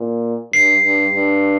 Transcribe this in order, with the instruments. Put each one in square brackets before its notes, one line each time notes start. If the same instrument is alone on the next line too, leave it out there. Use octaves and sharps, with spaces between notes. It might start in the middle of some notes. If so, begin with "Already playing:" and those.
Already playing: [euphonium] A#2
[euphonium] G2 [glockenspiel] C7
[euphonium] G2
G2